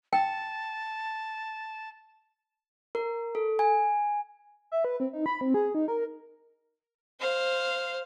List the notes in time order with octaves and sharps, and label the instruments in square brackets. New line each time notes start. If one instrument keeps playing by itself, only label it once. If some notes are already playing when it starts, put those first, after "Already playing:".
[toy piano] G5 [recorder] A5
[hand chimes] A#4
A4
G#5
[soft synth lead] E5
B4
C4
D#4
B5
C4
G#4
D#4
A#4
[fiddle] C5 F5